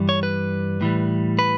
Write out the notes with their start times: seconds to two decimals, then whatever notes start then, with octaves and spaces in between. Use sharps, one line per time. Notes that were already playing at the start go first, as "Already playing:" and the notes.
Already playing: G2 E3 G3
0.09 C#5
0.23 B4
0.81 A2 E3 G3
1.39 B4